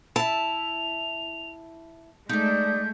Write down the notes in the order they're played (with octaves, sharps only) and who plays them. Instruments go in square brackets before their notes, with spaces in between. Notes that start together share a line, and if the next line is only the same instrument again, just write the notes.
[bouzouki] E4 E5 [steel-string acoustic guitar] A5 [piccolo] F7
[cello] G#3 A3 [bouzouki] D#4 D5 [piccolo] G6